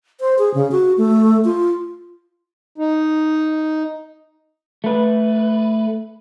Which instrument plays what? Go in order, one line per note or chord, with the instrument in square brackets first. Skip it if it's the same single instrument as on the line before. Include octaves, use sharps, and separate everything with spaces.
[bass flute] C5
G#4
C#3
F#4
A3
F4
[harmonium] D#4
[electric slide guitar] A3 B4